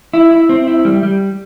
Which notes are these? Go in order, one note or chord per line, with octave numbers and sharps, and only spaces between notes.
E4
E4
C4
E4
G3
G3